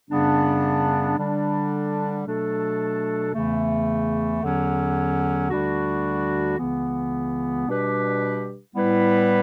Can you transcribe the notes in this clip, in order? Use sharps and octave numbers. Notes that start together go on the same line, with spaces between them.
F#2 C#3 G3 B3 D4
D3 G3 D4
B2 F#3 A3 D4 A4
E2 C#3 E3 A3
E2 D3 F#3 C#4
D2 D3 G3 D4 F#4
C#2 C#3 E3 B3
B2 G3 D4 G4 B4
A2 G3 B3 E4 B4